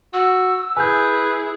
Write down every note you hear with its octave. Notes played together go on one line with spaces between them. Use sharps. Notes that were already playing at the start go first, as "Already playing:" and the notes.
F#4 E6
E4 G#4 B4 G#5 G6